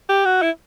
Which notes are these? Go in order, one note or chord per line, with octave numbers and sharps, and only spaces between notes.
G4
F#4
E4